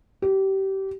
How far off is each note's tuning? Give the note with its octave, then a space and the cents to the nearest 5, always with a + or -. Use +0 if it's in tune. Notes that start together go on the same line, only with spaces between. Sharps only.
G4 -25